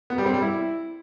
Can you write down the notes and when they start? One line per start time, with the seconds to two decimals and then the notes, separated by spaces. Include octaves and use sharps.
0.10 B3
0.18 G3
0.26 C4
0.34 G3
0.42 E4